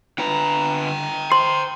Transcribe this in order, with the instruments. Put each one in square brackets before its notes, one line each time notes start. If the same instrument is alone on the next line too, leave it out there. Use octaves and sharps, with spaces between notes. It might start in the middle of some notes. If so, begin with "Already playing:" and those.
[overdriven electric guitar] D3 B4 [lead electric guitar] G5 A#5
[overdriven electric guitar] C5 [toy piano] C6